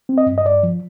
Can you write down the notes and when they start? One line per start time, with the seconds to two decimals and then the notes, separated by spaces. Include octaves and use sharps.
0.09 C4
0.18 D#5
0.26 G2
0.38 D#5
0.45 G2 D5
0.63 F3